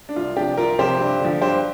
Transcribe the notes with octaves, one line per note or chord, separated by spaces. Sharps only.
D4
C2 F4
C3 F3 D4 G4
C2 F4 A#4
C3 F3 G4 C5
G2
D3 F3
G2 G4 C5